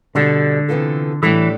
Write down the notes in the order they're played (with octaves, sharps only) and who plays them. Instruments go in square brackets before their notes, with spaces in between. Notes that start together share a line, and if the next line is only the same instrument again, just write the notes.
[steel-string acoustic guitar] B2 G3 D4 A4 [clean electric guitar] D3
[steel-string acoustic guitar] C3 E3 B3 F4 A4
[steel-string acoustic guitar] A2 G3 D4 A4 [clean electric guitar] E3